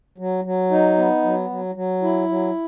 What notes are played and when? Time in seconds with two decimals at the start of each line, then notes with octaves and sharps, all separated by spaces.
0.18 F#3
0.45 F#3
0.71 D#4
0.97 B3
1.23 F#3
1.50 F#3
1.75 F#3
2.02 E4
2.29 F#3